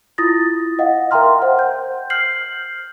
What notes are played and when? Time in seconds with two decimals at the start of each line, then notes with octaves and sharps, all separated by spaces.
0.18 E4 F4 D#6 A6 A#6
0.79 D#5 F5 F#5
1.11 A#4 E5 G5 A#5 C6 F6
1.42 C5 F#5
1.59 G6
2.10 F6 G6 C7 F#7